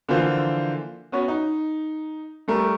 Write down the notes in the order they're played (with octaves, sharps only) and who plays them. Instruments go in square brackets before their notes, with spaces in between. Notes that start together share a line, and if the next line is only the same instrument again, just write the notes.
[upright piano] D3 E3 F3 A#3 F4 C5
B3 C#4 F#4 C#5
D#4
G3 A3 A#4